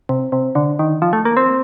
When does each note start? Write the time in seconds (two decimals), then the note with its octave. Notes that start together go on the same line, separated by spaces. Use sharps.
0.09 C3
0.32 C3
0.55 D3
0.79 D#3
1.02 F3
1.13 A3
1.25 A#3
1.37 C4